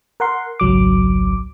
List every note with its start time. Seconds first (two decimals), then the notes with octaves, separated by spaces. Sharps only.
0.20 A#4 F#5 C6
0.60 G#1 C#2 F#3 D6